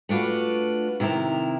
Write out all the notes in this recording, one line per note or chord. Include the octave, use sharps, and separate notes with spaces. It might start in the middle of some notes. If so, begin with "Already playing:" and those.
A3 D4 F4 F#4 B4
C3 D#3 E4 B4 A#5